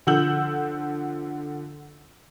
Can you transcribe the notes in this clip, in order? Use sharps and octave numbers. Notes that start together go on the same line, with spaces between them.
D3 F3 F#5 E6 G6 F#7